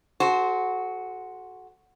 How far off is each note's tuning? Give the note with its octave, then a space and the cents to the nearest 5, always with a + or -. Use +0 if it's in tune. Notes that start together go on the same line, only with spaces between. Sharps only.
F#4 +0 A4 -40 C5 +0